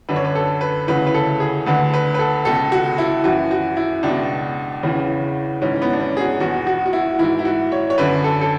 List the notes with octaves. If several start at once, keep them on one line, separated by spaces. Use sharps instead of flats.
F#2 D3 B4
C#5
B4
A4
B4
D2 C#3 E3 B4
B4
A4
G#4
D2 D3 B4
B4
B4
A4
C#2 B2 A4
F#4
E4
F#2 E3 F#4
F#4
E4
C#2 B2 D4
E2 C#3 E3
G#2 E3 C#4
B3
D4
C#4
G#4
F#4
E2 B2 F#4
F#4
F#4
E4
G#2 E3 E4
E4
F#4
C#5
C#5
F#2 D3 B4
A4
A4